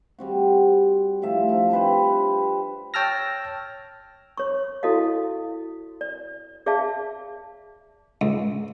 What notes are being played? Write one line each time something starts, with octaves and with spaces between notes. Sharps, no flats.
G3 C4 F#4
A2 F3 E5
F3 D4 A#4
C4 G4 B4 C5
C#5 G5 A5 E6 F6 A#6
C#5 C#6
E4 F#4 A4 D#5 F5
D5
G#4 D5 E5 F5 A5
C#2